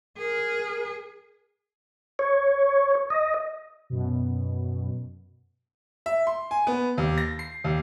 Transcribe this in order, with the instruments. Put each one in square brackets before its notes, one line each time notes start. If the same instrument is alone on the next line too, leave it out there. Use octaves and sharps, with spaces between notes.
[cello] G#4 [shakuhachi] A#4
[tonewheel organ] C#5
D#5
[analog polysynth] F#2 B2
[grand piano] E5
C6
G#5
B3
D#2
A#6
C7
D#2